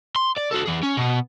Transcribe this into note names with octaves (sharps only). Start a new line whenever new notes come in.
C6
D5
F#4 A4
E3 G#4
C#4
B2 B3